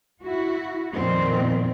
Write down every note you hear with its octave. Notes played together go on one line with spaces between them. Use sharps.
E4 F#4
F2 A#2 D#3 C4